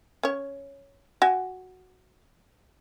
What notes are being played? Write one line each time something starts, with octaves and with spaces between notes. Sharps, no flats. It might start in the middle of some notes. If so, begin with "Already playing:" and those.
C#4 C#5
F#4 G#5